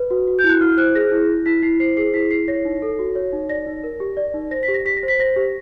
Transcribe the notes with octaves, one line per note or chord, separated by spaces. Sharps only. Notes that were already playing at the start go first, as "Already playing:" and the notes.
Already playing: B4
F#4
F#4
G6
E4
F#6
E4 F6
C5 F#6
G#4 A#6
E4
E4
E4 B6
E4 C7
C5 C7
G#4 C7
E4 B6
E4 C7
C#5 A#6
D#4
A4
F#4
C#5
D#4
D5 A#6
D#4
A#4
G4
D5
D#4
C5 A#6
B6
G4
A#6
G4 B6
A#6
C5
B6
C5 A#6
G4